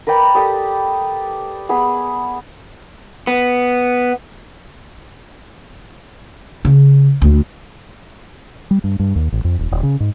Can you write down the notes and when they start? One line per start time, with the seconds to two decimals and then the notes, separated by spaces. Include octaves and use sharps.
0.07 A#4 B4 D5 G5
0.35 G4 A4 D5 D#6
1.69 B3 G#4 B5
3.27 B3
6.65 C#3
7.22 D2
8.71 G3
8.84 G2
9.00 G2
9.16 D#2
9.32 A1
9.45 F2
9.59 D#1
9.72 D#1
9.83 C#3
10.00 G#2